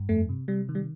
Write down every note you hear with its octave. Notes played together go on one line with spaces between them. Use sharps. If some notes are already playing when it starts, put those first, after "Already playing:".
Already playing: G2
F2 A3
C3
C3 G3
D#3
G3